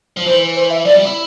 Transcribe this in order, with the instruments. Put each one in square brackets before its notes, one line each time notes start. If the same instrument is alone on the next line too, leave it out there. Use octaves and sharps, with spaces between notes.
[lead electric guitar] F3
[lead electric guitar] E3 [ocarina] C5
[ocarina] C5
E5
[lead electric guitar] F3 [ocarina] D5
[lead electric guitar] G3
E4